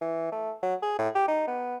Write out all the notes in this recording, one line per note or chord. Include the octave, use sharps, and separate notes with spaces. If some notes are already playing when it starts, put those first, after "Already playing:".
E3
A3
F#3
G#4
A2
G4
D#4
B3